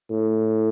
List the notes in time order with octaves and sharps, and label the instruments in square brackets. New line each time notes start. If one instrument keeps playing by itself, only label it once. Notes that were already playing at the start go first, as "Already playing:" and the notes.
[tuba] A2